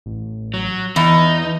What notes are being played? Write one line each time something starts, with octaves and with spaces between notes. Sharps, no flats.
A1
F#3
E2 E3 D#4